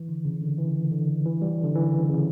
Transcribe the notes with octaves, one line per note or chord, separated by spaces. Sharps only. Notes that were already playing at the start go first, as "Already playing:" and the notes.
Already playing: E3
D3
C#3
D3
E3
D3
E3
G3
D3
E3
C#3
C#3